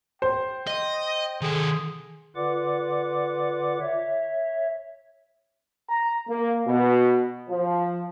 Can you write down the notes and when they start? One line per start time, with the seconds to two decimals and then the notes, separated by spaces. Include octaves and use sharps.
0.22 C5 G5
0.67 D#5
1.42 D#3 G#4 A4
2.36 D3 F4 B4 D5 F#5 D6
3.81 C#5 E5
5.89 A#5
6.29 A#3
6.66 B2
7.50 F3